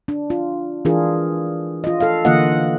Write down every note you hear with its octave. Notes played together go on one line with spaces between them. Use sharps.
D4
F4
E3 D4 F4 G#4 A#4
F4 D#5
A4 F5
D3 E3 A#3 F4 D#5 F#5